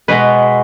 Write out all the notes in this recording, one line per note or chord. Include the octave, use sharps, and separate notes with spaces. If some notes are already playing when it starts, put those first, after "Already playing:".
B2 G#3 B3 B4